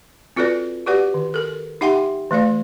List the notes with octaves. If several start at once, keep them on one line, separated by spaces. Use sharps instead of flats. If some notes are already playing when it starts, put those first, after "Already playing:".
C4 F4 F#4 A4 B4 D5
F#4 G4 B4 D5 F#5
D#3
A4 A#4
D#4 G4 E5 F#5 G5 C6
E3 A3 D5 F5